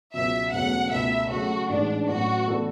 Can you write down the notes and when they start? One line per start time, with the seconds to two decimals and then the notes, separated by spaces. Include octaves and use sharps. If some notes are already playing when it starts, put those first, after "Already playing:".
0.14 C#2 B2 F#3 E5
0.53 E1 E2 C#3 F#3 A3 F#5
0.91 C#2 B2 A3 E5
1.31 C#3 F#3 A3 F#4
1.69 A1 G#2 E3 G#3 D4
2.09 A1 A2 F#3 F#4
2.47 A2 E3 B3 D4 A4